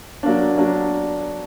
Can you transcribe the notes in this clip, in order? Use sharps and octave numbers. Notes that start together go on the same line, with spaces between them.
F#3 A#3 D4
F#3 A#3 D4